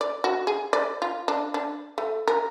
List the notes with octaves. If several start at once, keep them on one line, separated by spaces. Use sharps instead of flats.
D5
F#4
G#4
D5
F4
D4
D4
A3
A#4